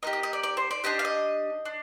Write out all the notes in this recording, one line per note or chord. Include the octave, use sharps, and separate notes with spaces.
A#3 D#4 G4 D#5
D#5
D#5
D5
D5
C5
D5
D4 G4 D#5
F5
D#5
D4